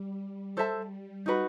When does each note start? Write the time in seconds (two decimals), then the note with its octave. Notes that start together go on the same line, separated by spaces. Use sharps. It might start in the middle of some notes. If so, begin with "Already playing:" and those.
Already playing: G3
0.21 G3
0.57 A4 C5 E5 A5
0.91 G3
1.26 D#4 F#4 B4